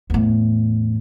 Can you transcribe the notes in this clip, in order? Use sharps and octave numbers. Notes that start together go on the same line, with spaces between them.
E2 A2